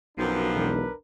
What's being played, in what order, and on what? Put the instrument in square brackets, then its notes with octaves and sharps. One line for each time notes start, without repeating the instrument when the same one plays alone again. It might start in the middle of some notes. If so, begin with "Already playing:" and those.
[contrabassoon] B1 [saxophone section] F#2 C3 F3 [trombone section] D4 A#4 B4
[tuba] E1